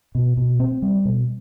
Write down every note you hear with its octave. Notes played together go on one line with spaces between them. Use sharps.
B2
B2
C4
G3
B2